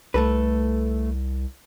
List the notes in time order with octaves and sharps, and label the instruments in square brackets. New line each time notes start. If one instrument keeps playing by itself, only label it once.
[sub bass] C2 [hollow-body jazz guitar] A3 A4 B4